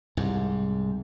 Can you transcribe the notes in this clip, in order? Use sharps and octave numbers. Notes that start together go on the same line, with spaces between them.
C2 G#2